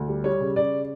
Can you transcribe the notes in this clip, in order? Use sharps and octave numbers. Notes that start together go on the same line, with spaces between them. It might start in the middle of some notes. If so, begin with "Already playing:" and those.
Already playing: D2
G3
G3 C#5
C#3
C#3 D5